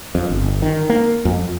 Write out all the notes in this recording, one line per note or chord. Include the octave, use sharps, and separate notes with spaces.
F2
G1
D#3
A#3
F2